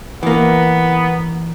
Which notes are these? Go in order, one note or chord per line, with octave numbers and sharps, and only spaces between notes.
E3 A#3 B3